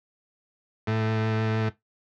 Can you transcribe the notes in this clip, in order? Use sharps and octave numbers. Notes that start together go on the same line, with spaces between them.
A2